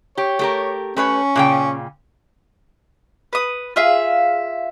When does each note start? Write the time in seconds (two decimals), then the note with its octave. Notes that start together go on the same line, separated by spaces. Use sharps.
0.17 G4 C#5
0.39 A3 G4 A#4
0.97 A3 C#4 B4 C#5
1.36 A#2 C#3 G5
3.33 B4 D#6
3.76 F4 G#4 E5 F5